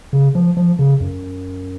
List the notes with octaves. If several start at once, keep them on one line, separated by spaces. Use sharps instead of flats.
C#3
F3
F3
C#3
F#2